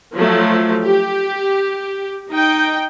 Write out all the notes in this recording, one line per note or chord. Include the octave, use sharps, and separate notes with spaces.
F3 F#3 A3
G4
D#4 G5